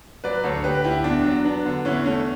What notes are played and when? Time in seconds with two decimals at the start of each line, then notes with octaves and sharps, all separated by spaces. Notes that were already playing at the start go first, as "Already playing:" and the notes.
0.24 F#3 B4 D5
0.44 D2 A4 C#5
0.64 D2 G4 B4
0.84 D2 E4 G4
1.04 E2 D4
1.25 F#3
1.44 B3 D4
1.66 D3
1.85 E2 C#4 E4
2.06 A3 C#4